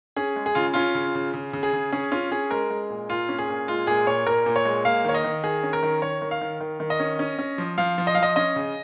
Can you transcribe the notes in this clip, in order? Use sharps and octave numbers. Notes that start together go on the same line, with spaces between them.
C#4 G#4
G#3
G#4
C#3 F4
C#4 F4
C#3
C#3
C#3
C#3
G#4
C#3
C#4 G#4
C#4 F4
C#4 G#4
G#3 A#4
G#3
A#2
A#2 F4
C#4
G#4
A#2
G#3 F4
A#2 G#4
A#2 C#5
A#2 A#4
A#2
C#5
G#3
A#3 F5
D#3 C#5
D#5
D#3
D#3 G#4
C#4
A#4
D#3
D#3 C#5
D#3
F5
D#3
D#3
D#3
D#5
C#4
C#4
C#4
F3
F3 F5
F3
D#5
F3 F5
D#5
C#4 D#5
C#3